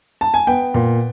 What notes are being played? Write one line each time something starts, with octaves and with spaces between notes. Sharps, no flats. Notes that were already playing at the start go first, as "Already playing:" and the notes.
A5
G#5
B3 G5
A#2